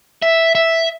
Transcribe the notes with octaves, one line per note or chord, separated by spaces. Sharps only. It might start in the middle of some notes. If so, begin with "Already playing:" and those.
E5
E5